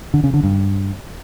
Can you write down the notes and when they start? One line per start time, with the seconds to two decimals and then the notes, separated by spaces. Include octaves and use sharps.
0.14 D3
0.24 C#3
0.34 D3
0.44 G2